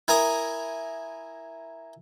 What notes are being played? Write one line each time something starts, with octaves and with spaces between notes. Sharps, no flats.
E4 A#4 G#5 A#5 D#6